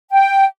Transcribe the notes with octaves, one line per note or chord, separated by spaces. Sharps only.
G5